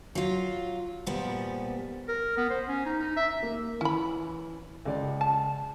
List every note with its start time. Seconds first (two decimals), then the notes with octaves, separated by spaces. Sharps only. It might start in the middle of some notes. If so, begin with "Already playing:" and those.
0.15 F#3 F4
1.06 A#2 F3 G3 B3
2.08 A#4
2.37 B3
2.50 C5
2.68 C#4
2.86 D#4
2.99 D#4
3.17 E5
3.42 A#3
3.81 E3 C#4 B5
4.85 C#2 D5
5.21 A5